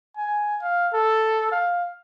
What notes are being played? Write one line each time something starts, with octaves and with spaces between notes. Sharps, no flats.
G#5
F5
A4
F5